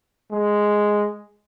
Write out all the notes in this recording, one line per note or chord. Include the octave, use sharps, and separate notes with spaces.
G#3